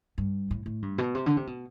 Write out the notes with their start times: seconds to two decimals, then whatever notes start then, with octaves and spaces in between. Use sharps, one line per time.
0.18 G2
0.51 A2
0.66 A2
0.82 G2
0.98 B2
1.15 C3
1.26 D3
1.37 C3
1.47 B2